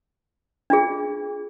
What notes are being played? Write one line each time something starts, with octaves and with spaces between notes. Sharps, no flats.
D4 F4 G#4